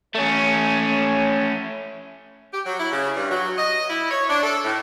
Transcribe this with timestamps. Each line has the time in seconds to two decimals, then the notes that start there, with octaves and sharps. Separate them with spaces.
0.15 A3 C#4 C#5
2.53 G4
2.66 F#3
2.80 E4
2.92 C#3
3.16 G2
3.30 F#3
3.58 D#5
3.88 E4
4.11 C#5
4.29 D4
4.43 A4
4.65 A2